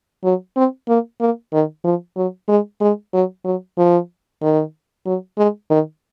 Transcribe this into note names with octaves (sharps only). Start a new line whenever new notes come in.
F#3
C4
A#3
A#3
D#3
F3
F#3
G#3
G#3
F#3
F#3
F3
D#3
F#3
G#3
D#3